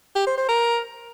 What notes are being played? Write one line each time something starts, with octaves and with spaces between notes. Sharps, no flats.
G4
C5
C5
A#4